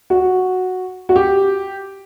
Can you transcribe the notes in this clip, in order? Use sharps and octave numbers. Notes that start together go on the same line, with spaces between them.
F#4
F#4
G4